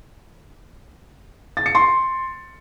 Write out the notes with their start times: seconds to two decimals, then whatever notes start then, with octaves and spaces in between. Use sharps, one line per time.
1.57 A6
1.66 C#7
1.75 C6